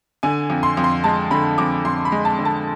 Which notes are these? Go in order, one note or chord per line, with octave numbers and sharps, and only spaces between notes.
D3 G#5
F2
C6
F2
C6
G#3 A5
D3 B5
F2 D6
F2 C6
B5
G#3
A5
D3
A5